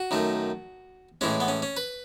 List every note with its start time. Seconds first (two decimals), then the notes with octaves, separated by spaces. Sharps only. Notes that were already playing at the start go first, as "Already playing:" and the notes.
Already playing: F#4
0.11 F#2 D#3 A3
1.21 A2 E3 G#3 C#4
1.40 B3
1.48 C#4
1.62 C#4
1.77 B4